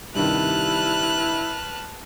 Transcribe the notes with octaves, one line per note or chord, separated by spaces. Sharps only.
G2 C3 D#3 E4 B4 A5 F6 F#6